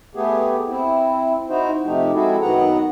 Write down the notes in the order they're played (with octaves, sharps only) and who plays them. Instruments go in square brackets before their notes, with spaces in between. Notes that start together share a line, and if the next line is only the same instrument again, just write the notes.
[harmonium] A3 B3 G4 G#4
C4 E4
D#4 E4 F#4 C5
C3 F3 A3 D#4 G4
G#3 C4 E4 F#4 G#4 A4
F#2 D#3 F#3 B3 F#5 A#5